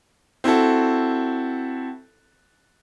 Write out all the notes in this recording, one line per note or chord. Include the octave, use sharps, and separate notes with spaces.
C4 E4 F#4 A4